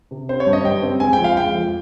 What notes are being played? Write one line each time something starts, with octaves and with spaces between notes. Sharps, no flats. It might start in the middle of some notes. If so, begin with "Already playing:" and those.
C3
C4 C5
C#5
G2
D#5
G2 G5
C4
G#3 G#5
G5
F2
F5
G#3 G5
F2